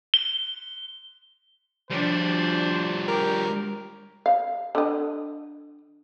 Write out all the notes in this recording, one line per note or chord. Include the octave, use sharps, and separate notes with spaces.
G7
F3 G3 D4 C5
G4 A#4
F5
D3 D#5